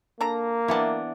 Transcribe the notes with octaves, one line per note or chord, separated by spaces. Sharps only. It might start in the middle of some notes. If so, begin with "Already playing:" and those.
A#3 D4 A4 A#5
E3 B3 D4 E4 A5